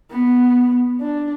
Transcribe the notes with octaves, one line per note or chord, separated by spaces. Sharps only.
B3
D4